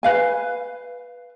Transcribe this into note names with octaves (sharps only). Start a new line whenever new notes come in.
B4 F5 G#5